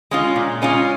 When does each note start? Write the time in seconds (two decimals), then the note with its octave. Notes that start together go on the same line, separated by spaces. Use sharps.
0.11 G#3 C#4 F4
0.36 A#2
0.62 G#3 C#4 F4